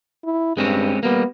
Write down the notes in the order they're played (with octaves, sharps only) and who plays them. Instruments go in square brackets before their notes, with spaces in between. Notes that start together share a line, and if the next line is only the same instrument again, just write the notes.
[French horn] E4
[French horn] G2 [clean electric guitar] G#3 C4 C#4
[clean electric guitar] G3 A#3 [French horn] B3